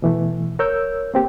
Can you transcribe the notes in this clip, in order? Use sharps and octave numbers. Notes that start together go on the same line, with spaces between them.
B2 E3 A3
A#4 C#5 E6 G6
A#3 C4 G4